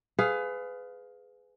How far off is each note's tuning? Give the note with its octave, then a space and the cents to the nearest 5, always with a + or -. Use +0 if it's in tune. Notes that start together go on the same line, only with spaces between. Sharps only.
G#4 +10 B4 +30 F5 +15